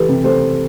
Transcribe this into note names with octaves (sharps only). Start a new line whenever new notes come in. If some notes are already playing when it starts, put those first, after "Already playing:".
Already playing: E3 G4 A4 B4
C3
A4 C5